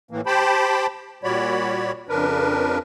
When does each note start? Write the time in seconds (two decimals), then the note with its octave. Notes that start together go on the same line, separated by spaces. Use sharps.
0.11 A2 E3 A#3
0.26 G4 C5 G5 A5 B5
1.24 A#2 G3 F#4 C#5 D5 B5
2.09 F2 C#3 D4 A#4 B4